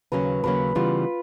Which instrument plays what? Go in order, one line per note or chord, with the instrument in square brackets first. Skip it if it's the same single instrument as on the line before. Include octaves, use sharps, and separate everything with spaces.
[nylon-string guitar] D#2 C#3 F#3 A#3 C#4 [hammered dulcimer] B4
[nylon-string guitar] D#2 C#3 F#3 A#3 C#4 [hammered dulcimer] B4
[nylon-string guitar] C#3 E3 G3 B3 [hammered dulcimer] F4